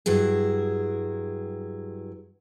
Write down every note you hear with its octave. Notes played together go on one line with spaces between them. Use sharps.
G2 F#3 E4 G#4